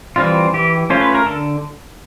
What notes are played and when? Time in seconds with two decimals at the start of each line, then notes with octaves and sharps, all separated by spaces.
0.16 E3 G3 C4 F4
0.54 E3 G4
0.90 A3 C#4 F4 C5
1.01 B4
1.15 A#4
1.26 D3 A4